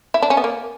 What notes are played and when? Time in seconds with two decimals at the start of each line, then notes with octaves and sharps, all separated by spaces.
0.14 E4
0.22 D4
0.30 C#4
0.37 B3
0.44 A#3